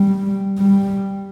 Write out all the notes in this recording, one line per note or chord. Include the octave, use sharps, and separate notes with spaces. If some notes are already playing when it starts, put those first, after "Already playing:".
Already playing: G3
G3